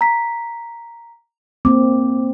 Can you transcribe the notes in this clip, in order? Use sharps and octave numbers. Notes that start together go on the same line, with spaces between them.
A#5 B6
A#3 C4 D6